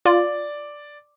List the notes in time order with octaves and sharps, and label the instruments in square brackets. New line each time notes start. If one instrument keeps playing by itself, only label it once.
[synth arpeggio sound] F4 [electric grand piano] D5